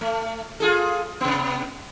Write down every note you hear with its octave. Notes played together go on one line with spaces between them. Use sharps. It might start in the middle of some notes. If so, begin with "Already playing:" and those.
A3
F4 G#4 A4
C3 B3